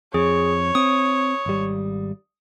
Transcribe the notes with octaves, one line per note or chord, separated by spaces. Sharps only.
F2 G#4 C#5
C4 D#6
G#1 G3